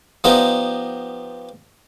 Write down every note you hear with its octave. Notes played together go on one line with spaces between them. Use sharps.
F3 B3 D4 D#4 G4